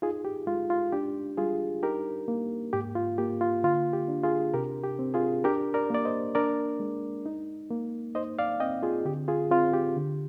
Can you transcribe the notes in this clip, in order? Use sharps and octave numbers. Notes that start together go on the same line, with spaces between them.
D#4 F4 G#4
G4
G#3 F4
F4
D4 G4
G3 F4 G#4
D#4 G4 A#4
A#3
G#2 G4
F4
A#3 G4
F4
D3 F4
G4
D4
F4 G#4
C3 G4 A#4
G4
C4
F4 G#4
D4 G4 A#4
A#4 D5
A#3 D5
C5 D#5
D4 A#4 D5
G#3
D#4
A#3
D#4 C5 D#5
D5 F5
C4 D#5 G5
F4 G#4
D3 G4
F4 G#4
C4 F4
G4
D3